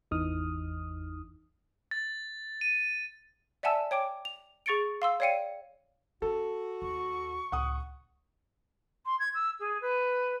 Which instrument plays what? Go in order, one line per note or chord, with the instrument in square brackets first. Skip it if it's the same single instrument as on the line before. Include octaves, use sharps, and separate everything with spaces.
[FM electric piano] G#1 E2 E3 D#4 D#6 F6
[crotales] A6
D#7
[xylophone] D5 E5 F#5 G#5 A5 E6
C#5 G5 D6 D7
F7
G#4 C#6 A6 C#7 D7
F5 C6 E6
C#5 D5 F5 G5 C#7 D#7
[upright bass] C#4 [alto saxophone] F#4 [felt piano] A4
[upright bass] D#2 [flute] C#6
[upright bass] C#2 A2 [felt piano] F#5 D#6
[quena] C6
G#6
E6
G#4
B4